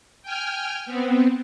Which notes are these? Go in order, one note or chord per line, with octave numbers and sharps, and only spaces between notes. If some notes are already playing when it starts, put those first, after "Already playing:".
G5 G#5 F6
B3 C4